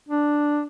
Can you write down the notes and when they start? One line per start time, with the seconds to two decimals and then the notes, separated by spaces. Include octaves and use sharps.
0.09 D4